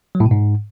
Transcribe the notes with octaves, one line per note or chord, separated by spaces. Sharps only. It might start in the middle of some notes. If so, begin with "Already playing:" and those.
F#3
A2
B2
G#2